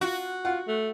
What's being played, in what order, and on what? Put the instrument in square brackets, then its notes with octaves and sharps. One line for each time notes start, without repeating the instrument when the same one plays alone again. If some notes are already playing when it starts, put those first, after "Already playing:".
[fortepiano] F4 [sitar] F#4
[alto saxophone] F4 [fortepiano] F#5
[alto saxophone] A3